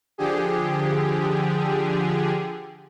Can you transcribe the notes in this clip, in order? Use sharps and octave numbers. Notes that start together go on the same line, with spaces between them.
D3 F3 G4 G#4